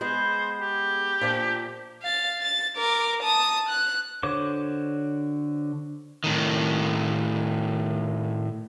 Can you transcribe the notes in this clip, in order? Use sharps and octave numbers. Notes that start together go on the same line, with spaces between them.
G#3 B3 G#4 C5
G4
A#2 F3 D4
F5 A6
A6
A#4 D6
A5 D#6
F#6
D3 F#4 C5 C#5 D6
A2 D#3